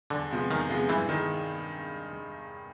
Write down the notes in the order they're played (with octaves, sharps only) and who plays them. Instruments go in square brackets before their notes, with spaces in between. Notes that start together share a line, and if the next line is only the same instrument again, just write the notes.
[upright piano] E2 [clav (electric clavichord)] D3
[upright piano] C3 F3 G#3 B3
[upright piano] E2 [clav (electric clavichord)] D#3
[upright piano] C3 F3 G#3 B3
[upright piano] G2 [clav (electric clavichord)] E3
[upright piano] D#3 G#3